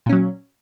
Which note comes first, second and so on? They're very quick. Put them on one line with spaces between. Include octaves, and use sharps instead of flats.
A#2 C#4 F#3